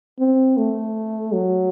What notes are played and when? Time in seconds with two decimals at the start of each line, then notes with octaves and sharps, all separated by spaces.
0.20 C4
0.57 A3
1.33 F#3